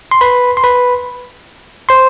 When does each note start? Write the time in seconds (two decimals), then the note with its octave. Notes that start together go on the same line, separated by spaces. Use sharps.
0.11 C6
0.21 B4 B5
0.57 C6
0.64 B4 B5
1.89 C5 C6